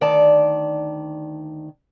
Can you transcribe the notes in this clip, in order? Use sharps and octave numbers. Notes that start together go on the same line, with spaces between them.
D2 D#3 D5 A5